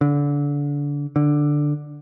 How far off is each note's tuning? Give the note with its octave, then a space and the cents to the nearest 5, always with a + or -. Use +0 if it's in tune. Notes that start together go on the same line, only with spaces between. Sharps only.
D3 -25
D3 +5